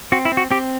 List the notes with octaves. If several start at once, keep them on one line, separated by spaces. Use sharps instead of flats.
C4 F#4
E4
C4
F#4
C4 G4